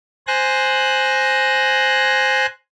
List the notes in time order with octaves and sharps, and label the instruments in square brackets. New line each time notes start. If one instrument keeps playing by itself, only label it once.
[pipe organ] C5 G#5 F#6 A#6